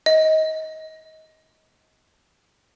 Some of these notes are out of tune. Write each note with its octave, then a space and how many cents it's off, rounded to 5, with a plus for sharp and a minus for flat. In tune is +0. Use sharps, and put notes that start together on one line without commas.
D#5 +20